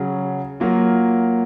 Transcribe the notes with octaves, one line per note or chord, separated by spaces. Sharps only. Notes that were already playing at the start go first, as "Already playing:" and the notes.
Already playing: C#3 F#3 C#4
F#3 A#3 F4